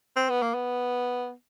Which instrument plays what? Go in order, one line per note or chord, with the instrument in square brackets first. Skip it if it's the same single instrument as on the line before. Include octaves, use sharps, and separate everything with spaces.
[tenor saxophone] C4
B3
A#3
B3